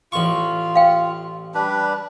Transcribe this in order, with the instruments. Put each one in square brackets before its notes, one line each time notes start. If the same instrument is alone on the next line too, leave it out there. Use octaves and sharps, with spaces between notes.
[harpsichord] A1 C#6 [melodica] F4
[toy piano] F5 G5
[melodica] G3 D4 B4